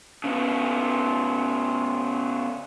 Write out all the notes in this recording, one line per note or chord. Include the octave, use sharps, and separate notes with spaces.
C#3 B3